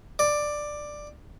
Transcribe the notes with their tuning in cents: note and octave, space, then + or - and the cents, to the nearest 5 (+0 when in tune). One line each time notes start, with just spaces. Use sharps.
D5 +10